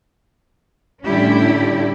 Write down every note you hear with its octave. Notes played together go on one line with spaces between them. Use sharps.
A2 D3 G3 C#4 E4 G4